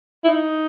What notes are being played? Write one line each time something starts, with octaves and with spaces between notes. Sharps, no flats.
E4
D#4